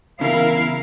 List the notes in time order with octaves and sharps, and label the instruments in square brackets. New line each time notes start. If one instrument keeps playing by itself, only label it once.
[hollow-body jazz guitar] E2 C#3 [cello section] E4 A#4 F5